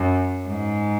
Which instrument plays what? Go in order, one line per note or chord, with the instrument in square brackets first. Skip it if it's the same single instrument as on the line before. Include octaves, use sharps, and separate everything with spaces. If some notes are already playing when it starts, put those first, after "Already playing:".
Already playing: [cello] F#2
G#2